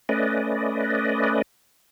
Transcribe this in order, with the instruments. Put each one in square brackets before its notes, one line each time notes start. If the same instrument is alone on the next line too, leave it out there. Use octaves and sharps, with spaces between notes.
[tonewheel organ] A3 C#4 B4 D5 D#5